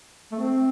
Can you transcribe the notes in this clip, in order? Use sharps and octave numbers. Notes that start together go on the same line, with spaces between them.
A3
C4